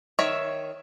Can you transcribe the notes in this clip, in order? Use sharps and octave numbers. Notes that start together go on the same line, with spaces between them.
D#3 C#5 E5